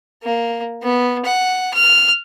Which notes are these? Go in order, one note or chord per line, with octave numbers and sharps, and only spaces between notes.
A#3
B3
F#5
F6